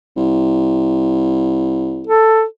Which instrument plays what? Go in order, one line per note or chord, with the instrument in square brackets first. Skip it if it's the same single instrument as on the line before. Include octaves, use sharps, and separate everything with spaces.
[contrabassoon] C2
[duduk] A4